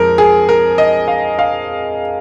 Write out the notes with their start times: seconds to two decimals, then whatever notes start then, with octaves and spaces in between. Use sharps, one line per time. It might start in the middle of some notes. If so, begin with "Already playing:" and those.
Already playing: F2 F3 G#3 A#4
0.18 G#4
0.49 A#4
0.78 D#5
1.08 F5
1.39 F5